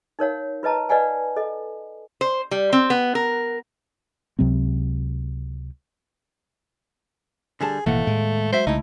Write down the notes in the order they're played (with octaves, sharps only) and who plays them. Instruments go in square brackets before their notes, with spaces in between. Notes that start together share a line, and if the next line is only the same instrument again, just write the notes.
[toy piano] D#4 A#4 C#5 F5
F4 B4 D#5 A5 A#5
B4 D5 D#5 F5 F#5 G#5
A4 D#5
[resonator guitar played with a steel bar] C5
G3
C4
B3
A#4
[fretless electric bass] C#2 C3 F#3 C4
[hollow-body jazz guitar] D3 G3 A5 [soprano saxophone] G#4
[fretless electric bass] A1 B2 A#3 [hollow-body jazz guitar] D#2 F#5 [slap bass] E3 [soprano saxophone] A3
[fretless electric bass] A2 [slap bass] G#3
[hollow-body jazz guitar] F#3 E5 [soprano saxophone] C5
[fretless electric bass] C2 C#3 [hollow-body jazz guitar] A3 E4 [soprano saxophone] D#4